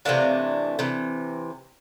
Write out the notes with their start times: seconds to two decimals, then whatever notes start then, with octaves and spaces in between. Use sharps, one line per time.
0.05 C3 E3 A3 D4 F5
0.79 C3 E3